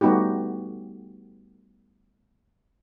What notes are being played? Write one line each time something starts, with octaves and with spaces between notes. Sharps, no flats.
G3 A3 B3 D#4 F#4 G4